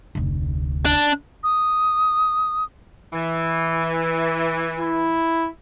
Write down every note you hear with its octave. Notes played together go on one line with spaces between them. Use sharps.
F1 D2
D4
D#6
E3
E4